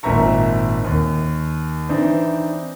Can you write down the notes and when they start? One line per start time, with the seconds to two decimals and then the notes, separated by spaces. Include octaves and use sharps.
0.03 G#1 A#2 C4 E5 A#5 C#6
0.84 D#2
1.89 E3 C4 D4 D#4